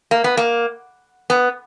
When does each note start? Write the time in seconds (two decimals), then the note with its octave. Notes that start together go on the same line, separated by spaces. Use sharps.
0.11 A#3
0.24 B3
0.37 A#3
1.30 B3